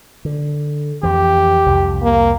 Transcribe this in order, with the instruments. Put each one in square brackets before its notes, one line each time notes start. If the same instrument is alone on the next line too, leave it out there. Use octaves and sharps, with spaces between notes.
[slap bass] D3
[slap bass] F2 E3 [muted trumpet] G4
[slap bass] C2 F2
[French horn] A#3